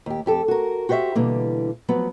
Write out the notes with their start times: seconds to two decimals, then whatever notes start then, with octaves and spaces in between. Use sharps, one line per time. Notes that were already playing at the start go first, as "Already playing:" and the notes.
0.06 D#2 G4
0.26 F2 G4 A4
0.48 F#4 A#4
0.89 F#4 G4 C5 D5 E5
1.15 B2 D3 E3 G3 A#3
1.88 F3 F#3 B3